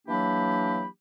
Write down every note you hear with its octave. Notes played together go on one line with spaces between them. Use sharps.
E3 F#3 A#3 D4 G4 B5